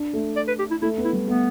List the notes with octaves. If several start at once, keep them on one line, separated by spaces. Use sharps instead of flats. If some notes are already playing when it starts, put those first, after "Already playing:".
Already playing: D4
A3
D5
B4
G4
E4
A3 E4
B3
E4
G3
A3 B3